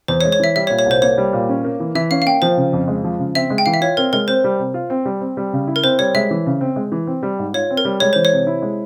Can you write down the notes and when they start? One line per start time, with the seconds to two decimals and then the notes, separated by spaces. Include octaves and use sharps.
0.08 E2 C5
0.21 C#5
0.25 G#3
0.32 C#5
0.40 E3 E5
0.56 G3 E5
0.67 C#5
0.70 A#2
0.79 C#5
0.86 C2 C5
1.02 A#3 C#5
1.18 G3
1.33 A#2
1.49 C#4
1.65 A#3
1.80 E3
1.95 E3 E5
2.11 C#4 F5
2.22 F5
2.26 A#3 G5
2.42 F3 C5
2.57 C#3
2.73 F2
2.88 G#3
3.04 F3
3.19 C#3
3.35 C4 E5
3.50 G#3
3.58 G5
3.66 E3 F5
3.74 E5
3.81 F4 C#5
3.97 C4 A#4
4.13 G#3 A#4
4.28 C4 C5
4.44 G3
4.59 C3
4.74 F4
4.90 C4
5.05 G3
5.21 C4
5.37 G3
5.53 C#3
5.67 E4
5.76 A#4
5.84 C4 C5
5.99 G3 C#5
6.15 G#3 E5
6.31 E3
6.46 C#3
6.61 C4
6.76 G#3
6.92 E3
7.07 C4
7.23 G3
7.39 G#2
7.54 F4 C#5
7.70 C4
7.77 A#4
7.85 G3
8.00 G#3 C#5
8.13 E3 C5
8.25 C#5
8.32 C3
8.47 E4
8.62 G#3